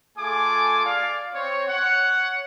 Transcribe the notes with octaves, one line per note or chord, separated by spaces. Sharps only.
A3 F4 G#4 A4 G#5 D6
D5 F5
C4 C#5
C#5 F#5